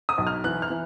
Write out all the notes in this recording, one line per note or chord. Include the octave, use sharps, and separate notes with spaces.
D#6
B1
F6
E3 F#6
F6
E3